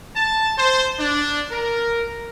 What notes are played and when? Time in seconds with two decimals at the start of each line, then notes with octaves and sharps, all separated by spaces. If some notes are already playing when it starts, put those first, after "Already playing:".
0.16 A5
0.58 C5
1.00 D4
1.52 A#4